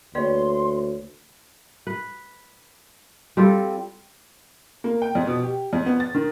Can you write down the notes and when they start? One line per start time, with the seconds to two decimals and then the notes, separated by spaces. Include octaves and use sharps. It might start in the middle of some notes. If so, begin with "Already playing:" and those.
0.15 D2 A#3 B4 C#5 D5 C6
1.87 B4
3.37 G3 C4 F4 A4
4.84 A#3
5.02 G5
5.15 F2
5.27 B2
5.43 G4
5.73 F2
5.86 B3
6.00 A6
6.15 D#3